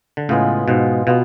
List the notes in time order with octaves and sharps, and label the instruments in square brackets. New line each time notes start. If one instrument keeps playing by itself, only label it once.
[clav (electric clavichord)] D3
[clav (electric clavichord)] A2 C#3 [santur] G#3 B3 F4
[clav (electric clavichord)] G#2 B2
[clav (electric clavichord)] B2 [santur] B3 F4